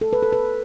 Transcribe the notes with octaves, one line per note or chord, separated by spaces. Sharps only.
A4
B4
A4
B4